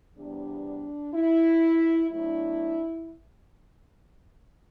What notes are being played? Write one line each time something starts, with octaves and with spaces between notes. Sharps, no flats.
E2 C3 G3 B3 D4
E4
A2 F#3 B3 D4 E4